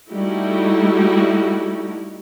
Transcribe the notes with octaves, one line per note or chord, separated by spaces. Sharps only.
G3 A3 D#4 E4 F#4 G4